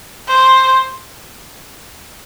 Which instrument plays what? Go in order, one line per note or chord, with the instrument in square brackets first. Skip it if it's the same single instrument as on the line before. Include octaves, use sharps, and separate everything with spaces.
[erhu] C5